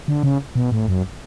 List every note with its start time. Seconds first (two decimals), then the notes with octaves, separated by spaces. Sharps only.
0.08 D3
0.23 C#3
0.55 B2
0.72 A2
0.88 F#2